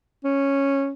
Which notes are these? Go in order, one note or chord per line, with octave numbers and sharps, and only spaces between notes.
C#4